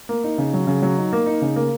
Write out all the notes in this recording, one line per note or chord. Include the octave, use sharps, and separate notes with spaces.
A#3
D#4
C#3
F#3
C#3
F#3
D#4
A#3
D#4
C#3
A#3